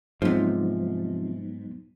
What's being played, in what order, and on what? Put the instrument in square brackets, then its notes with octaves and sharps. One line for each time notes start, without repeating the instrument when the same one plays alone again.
[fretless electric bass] G#2 [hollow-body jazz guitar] C3 F3 [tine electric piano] F#3 B3 D#4